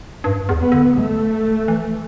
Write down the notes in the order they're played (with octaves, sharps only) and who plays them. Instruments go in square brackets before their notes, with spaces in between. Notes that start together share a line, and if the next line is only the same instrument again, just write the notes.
[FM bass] G2
E2
[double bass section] B3
[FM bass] D3
[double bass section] A3
[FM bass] E3